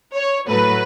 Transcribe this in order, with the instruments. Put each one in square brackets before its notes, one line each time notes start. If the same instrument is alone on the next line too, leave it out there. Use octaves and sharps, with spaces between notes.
[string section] C#5
A2 F#3 A3 B4